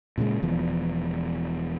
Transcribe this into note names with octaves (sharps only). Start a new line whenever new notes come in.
A#2 C#3 F3 G#3
E1 E2 F3